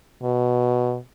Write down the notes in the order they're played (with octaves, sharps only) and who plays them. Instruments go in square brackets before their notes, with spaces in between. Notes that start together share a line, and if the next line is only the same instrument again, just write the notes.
[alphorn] B2